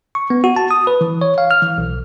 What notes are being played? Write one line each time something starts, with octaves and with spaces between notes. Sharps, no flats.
C#6
B3
F#4
A5
D#6
B4
E3
C#5
F5
F6
E3
B1